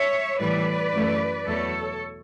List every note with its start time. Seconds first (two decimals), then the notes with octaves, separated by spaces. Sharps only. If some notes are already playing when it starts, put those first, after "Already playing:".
Already playing: C#5 E5
0.40 A2 E3 G3 B4 D5
0.93 F#2 E3 A3
1.46 E2 B2 F#3 A3 A4 C#5